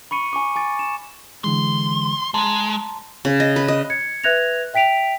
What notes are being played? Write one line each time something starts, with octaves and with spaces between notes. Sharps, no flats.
B5 C#6 C#7 D#7
G#5 C#6 D6
G#5 D6 A6
E7
D3 E3 G#3 C6
G#3 A5 A#5 C6
C#3
D#5
B4
D#5
G#6 C#7
B4 E5 F#6 G#6 A#6 F7
E5 G5 B6 D7 F7